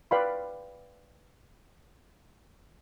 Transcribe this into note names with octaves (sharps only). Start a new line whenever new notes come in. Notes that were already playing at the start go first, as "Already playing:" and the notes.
B4 D5 F5 G5 B5 C6